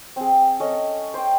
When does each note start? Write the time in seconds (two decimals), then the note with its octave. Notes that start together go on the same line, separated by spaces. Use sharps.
0.16 C4 G#4
0.60 C#4 A4 D#5
1.14 C5 G5